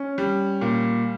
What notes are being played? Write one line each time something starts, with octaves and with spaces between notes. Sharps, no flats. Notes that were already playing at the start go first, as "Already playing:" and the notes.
Already playing: C#4
G3
A#2